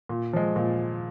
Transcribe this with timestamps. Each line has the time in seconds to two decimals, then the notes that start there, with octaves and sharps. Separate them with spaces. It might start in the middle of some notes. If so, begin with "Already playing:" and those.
0.09 A#2
0.33 F3 G#3
0.56 A#2